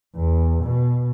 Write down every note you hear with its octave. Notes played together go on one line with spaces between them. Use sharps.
E2
B2